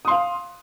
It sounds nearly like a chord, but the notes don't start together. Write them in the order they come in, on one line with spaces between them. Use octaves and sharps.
D#6 C6 F5